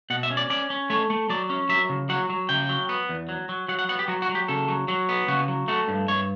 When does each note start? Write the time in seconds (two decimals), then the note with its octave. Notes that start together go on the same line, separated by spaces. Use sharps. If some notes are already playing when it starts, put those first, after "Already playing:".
0.10 B2 F#5
0.23 E5
0.30 C#4
0.37 D5
0.50 C#4 D5
0.70 C#4
0.90 A3 C#5
1.10 A3
1.29 F#3 D5
1.50 C#4
1.69 F#3 E5
1.89 C#3
2.09 F#3 F#5
2.30 F#3
2.49 C#3 G5
2.69 F#3
2.89 B3
3.09 E2
3.29 F#3
3.49 F#3
3.68 F#3 F#5
3.79 F#5
3.89 B3 F#5
3.99 G4
4.08 F#3 F#4
4.22 F#4
4.29 F#3
4.35 G4
4.48 C#3 A4
4.68 F#3
4.88 F#3
5.09 B3
5.28 C#3 F#4
5.48 F#3
5.68 A3 F#4
5.88 G2
6.08 G2 C#5